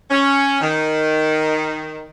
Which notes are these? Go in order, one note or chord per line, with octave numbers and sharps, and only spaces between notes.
C#4
D#3